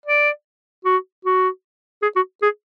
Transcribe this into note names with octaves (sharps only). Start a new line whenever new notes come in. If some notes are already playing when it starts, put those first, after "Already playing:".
D5
F#4
F#4
G#4
F#4
G#4